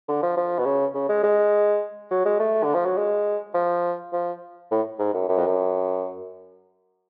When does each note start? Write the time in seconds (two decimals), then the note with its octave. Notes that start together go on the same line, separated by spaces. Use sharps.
0.08 D3
0.23 F3
0.37 F3
0.58 B2
0.65 C#3
0.95 C#3
1.09 G#3
1.23 G#3
2.11 F#3
2.25 G#3
2.39 A3
2.63 D3
2.74 F3
2.85 F#3
2.97 G#3
3.54 F3
4.13 F3
4.71 A2
4.99 G#2
5.14 F#2
5.29 F#2
5.38 F2
5.46 F#2